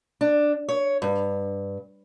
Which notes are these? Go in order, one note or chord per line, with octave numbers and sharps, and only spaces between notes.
D4
C#5
G2